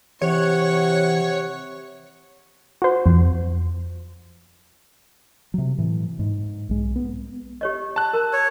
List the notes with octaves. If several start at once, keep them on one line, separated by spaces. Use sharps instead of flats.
C3 E3 C#5 F#5 C#6
F#4 C5
F2
C3 F#3
A2 E3
G#2
B1 G#3
B3
G4 C#5 D#5
A5 F#6
A#4 A#5
C#5